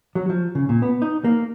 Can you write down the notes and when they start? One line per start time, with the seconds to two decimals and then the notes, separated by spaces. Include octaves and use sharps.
0.15 F#3
0.29 F3
0.55 C#3
0.69 A#2
0.82 B3
1.02 D#4
1.24 A#3